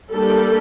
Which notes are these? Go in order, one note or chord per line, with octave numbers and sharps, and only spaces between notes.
G3 A#3 D4 A4